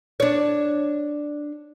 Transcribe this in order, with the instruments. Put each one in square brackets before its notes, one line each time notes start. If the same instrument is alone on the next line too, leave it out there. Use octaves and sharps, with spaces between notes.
[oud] D4 C#5